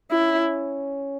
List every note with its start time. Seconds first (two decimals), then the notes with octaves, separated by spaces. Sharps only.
0.11 C#4 E4